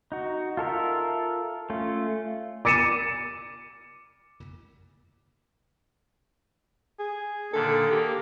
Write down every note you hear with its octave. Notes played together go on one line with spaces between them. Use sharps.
D#4 F#4
F4 A4 A#4 E5
A3 C#4 F4
D6 A6 C#7 D#7 E7
G#4
A#2 D3 D#3 A4
A#3 G4